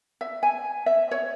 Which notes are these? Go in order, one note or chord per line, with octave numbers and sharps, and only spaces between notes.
E5
G#5
E5
C#5